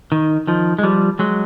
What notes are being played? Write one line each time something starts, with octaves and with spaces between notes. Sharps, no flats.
D#3
D#3 F3
G#3
F3 G3
F#3 G#3